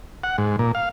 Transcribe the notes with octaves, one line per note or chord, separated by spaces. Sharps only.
F#5
G#2
A#2
F5